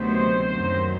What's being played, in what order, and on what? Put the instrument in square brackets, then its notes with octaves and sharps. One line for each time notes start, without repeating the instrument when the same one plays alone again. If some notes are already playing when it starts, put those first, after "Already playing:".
Already playing: [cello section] D2 C3 D#3 F#3 B3 [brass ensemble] C5
[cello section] F#2 D#3 F#3 A#3